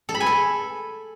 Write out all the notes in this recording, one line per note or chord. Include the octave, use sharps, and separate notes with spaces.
A4
B5
G#5
A4